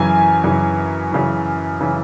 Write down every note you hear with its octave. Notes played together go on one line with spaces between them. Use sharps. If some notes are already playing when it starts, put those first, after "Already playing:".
Already playing: F#2 C#3 E3 G#5
F#2 C#3 E3
F#2 C#3 E3
C#3 E3